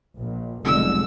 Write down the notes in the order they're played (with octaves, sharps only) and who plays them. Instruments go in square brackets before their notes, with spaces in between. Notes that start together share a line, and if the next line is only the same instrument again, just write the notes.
[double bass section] A#1
[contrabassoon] F1 [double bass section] B1 D3 G#3 [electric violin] E6